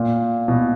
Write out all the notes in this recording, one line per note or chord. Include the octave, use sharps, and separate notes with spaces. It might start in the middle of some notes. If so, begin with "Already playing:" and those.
Already playing: A#2
B2